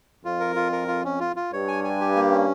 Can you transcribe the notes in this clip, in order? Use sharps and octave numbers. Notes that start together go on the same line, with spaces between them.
F2 F4
A#4
F4
A#4
F4
C#4
F4
F4
G2 C#5
G#5
G#5
G4
A#3
C#4